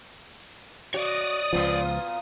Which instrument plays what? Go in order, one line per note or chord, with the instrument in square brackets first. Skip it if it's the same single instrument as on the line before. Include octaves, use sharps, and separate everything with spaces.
[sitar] F#4 [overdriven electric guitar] C#5 D5 [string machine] D#6
[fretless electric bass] C#2 F3 [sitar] A#2 B3 F4